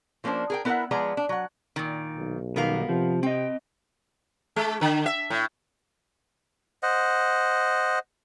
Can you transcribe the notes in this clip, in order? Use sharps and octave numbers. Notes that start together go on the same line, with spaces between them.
F3 A#3 C#4 D4 C5
G#4 A#4 G5
B3 E4 A#4 D5 E5 F#5
F3 G#3 B3 G#4 D5 A#5
D4
F#3 F#5
A#2 D#3
B1
B2 D#3 G3 B3 A#4 F5
C3 F3
C4 D#5 G5
G#3
D3
E5
A2
C5 D#5 F#5